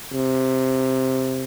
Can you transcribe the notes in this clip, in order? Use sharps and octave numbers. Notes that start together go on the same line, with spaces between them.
C3